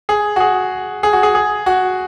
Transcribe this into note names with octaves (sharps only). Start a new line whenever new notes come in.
G#4
F#4
G#4
G#4
F#4
G#4
G#4
F#4